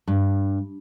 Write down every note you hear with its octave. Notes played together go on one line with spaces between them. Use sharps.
G2